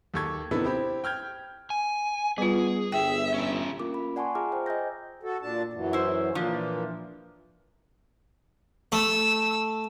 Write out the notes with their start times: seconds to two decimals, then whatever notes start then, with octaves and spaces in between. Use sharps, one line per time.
0.14 D#2 G4 A4 C#6 G#6
0.51 C3 D#3 B3 D4 E4 A4
0.64 C4 E4 G4
1.04 G5 F6 G6 G#6
1.70 G#5
2.38 G3 B3 F4 G#4
2.92 G1 E5 G5
3.34 C#4 G4
3.80 A#3 C#4 F4 A#4 D6
3.94 B5
4.16 D5 F#5 G#5 A5 C6 C#6
4.35 F4 G#4 E5 A#5 D6 F6
4.52 C5 G5
4.66 D#5 G#5 E6 G6 A#6
5.23 F#4 A4
5.42 A#2 D4 A5
5.73 F#2 E3 F#3
5.93 E4 C5
6.35 A#2 E3 F3 A#3 D4
8.92 A3 E6